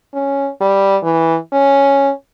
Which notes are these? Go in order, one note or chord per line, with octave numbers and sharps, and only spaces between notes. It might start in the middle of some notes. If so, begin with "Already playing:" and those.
C#4
G3
E3
C#4